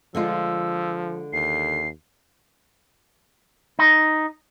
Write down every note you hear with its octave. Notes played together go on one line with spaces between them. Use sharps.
D3 F3 G#3 F4 E6
D#2 C7
D#4